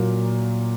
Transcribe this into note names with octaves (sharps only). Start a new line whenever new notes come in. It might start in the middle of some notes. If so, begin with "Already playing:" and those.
Already playing: A#2 F#3 A#3